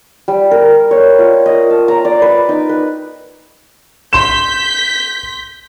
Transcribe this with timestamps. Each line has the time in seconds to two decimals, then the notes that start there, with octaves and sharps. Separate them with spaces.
0.28 G3
0.51 A#4
0.91 C#5
1.19 F4
1.46 D#5
1.70 A5
1.88 A#5
2.05 D5
2.22 B4
2.49 D#4
2.69 B4
4.13 C6 G6 B6 E7